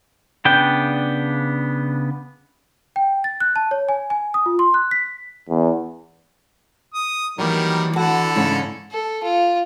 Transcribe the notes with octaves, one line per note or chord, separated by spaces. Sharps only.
C#3 B3 D4 G5
G5
A6
F#6
A5
C#5
G#5
G#5
D#6
F4
C6
F#6
B6
E2
D#6
D#3 E3 F#3 G3 A#3
D3 E4 F#4 A4 F#5 A5
G#2 C#3 C#5
A4
F4